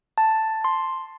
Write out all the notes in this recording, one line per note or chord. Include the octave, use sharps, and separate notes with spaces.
A5
C6